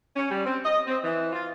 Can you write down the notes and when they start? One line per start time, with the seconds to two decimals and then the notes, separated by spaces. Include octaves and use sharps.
0.15 C#4
0.30 G3
0.44 C4
0.63 D#5
0.86 C4
1.03 E3
1.32 F4